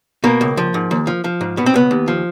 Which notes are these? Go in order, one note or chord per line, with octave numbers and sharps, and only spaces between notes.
B2 A#3
C#2
F3
G#2
D#2
F3
F3
G#2
B2 B3
C4
C#2 B3
D#2
F3